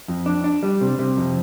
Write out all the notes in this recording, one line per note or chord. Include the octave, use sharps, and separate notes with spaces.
F2
D4
D4
G3
C3
C3
F2